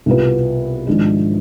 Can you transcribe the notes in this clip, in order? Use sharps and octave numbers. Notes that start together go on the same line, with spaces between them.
C2 B2 B3 F4 B4
G#1 G#2 F3 G#3 D4